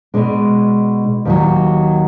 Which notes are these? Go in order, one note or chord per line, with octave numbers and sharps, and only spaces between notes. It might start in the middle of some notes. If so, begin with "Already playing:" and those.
B2 G#3 D4
D#2 D#3 F#3